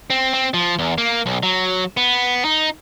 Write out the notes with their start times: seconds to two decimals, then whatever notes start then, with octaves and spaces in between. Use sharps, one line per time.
0.10 C4
0.34 C4
0.54 F3
0.79 E2
0.98 A#3
1.26 B1
1.43 F#3
1.97 B3
2.45 D#4